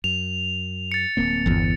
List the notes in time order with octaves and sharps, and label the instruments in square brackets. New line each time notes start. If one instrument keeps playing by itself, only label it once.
[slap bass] F#2 [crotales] F7
[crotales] A6 C#7
[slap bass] D1 A#3 C4
[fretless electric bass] G1 E2